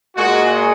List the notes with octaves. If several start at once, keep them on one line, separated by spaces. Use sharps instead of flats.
A#2 G#3 F#4